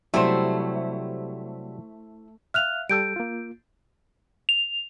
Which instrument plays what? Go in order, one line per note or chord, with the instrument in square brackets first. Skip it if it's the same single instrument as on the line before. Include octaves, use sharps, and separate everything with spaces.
[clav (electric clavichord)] C3 F#3 G3 [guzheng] A3 [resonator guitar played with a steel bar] E4 C5
[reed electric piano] E5 F5 [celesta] F6 F#6 F7
[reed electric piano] G3 G4 A4 [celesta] E6 G6 D7
[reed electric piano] A#3 F4
[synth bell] F7